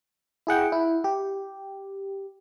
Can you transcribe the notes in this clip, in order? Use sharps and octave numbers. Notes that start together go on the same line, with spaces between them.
E4 G#4 F#5 G5
E4
G4